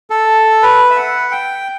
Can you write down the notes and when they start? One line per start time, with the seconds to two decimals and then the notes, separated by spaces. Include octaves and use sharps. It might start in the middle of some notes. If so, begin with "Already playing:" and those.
0.10 A4
0.62 B4
0.90 E5
0.96 F#5
1.31 G5